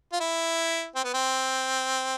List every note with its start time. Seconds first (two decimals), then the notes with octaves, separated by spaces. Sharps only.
0.12 F4
0.21 E4
0.96 C4
1.04 B3
1.14 C4